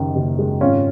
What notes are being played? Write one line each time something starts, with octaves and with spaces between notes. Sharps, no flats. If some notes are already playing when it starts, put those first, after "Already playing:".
Already playing: F#1 F#2 D#3
F#1
G#3
G#1 C#4 F4